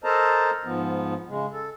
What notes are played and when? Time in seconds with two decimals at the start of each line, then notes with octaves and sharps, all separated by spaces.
0.04 A4 A#4 C5 D#5 A5 A#5
0.64 G#2 F3 B3
1.28 C#3 G#3
1.53 A4